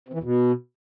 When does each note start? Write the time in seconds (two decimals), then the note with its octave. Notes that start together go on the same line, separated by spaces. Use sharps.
0.08 C3
0.14 E3
0.19 E2
0.24 B2